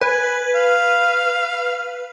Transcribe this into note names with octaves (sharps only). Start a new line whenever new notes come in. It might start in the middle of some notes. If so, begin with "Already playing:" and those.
B4 G#5
F5